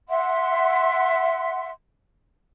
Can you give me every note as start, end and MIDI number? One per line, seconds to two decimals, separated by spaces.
0.09 1.70 76
0.09 1.70 78
0.09 1.70 84